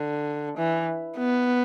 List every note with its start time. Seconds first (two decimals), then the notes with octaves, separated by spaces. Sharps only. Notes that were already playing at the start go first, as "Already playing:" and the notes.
Already playing: D3
0.57 E3
1.17 B3